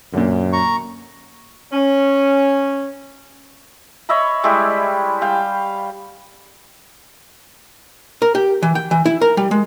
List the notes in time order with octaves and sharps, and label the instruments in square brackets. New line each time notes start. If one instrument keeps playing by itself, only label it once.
[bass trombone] F#2 [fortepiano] A#2 D3
[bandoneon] A#5 C#6
[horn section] C#4
[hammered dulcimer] C#5 D#5 E5 B5
G3 G#3 E4 G4
G3 F5 G5
[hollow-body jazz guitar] A#4
G4
E3
G5
E3
E4
A#4
G3
G#3